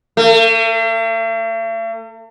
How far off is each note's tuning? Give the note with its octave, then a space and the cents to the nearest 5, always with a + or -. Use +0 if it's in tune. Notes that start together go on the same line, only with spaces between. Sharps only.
A3 +45